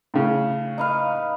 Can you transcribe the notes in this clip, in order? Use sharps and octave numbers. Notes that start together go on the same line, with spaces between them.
A2 C#3
D#4 B4 F5